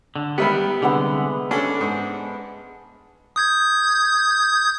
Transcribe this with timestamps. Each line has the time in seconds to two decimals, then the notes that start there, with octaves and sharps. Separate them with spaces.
0.16 D3
0.38 D#3 G3 B3 G4 E5 B5
0.82 C2 D3 G#3 B3 F#5
1.51 C#4 D4 A4 F#5
1.81 G#2
3.36 D#6 G6 G#6